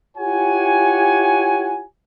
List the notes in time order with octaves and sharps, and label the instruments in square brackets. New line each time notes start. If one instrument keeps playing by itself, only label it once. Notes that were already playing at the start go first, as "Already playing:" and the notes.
[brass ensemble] E4 F4 G4 C#5 F#5 G#5